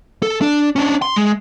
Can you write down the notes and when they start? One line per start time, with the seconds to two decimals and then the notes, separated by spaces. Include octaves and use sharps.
0.23 A4
0.42 D4
0.76 C#4 D4
1.02 C6
1.16 G#3